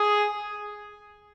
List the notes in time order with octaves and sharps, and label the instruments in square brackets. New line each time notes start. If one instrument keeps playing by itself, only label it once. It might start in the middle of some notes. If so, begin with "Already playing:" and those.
Already playing: [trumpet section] G#4